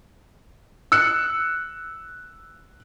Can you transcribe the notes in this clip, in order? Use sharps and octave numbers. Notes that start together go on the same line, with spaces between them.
E6 F#6 C#7